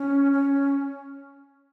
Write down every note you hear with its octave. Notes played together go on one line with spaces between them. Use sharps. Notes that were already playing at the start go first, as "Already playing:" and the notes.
Already playing: C#4
C#4